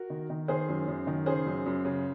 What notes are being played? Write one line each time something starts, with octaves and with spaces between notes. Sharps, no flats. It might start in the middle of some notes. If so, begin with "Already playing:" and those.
Already playing: F#4 A#4
D#3
D#3
D#3 G#4 C5
F#2
F#2
D#3
C#3 G#4 C5
F#2
F#2
C#3